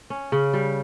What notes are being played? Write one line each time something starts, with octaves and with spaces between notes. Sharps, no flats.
C#4
C#3
G3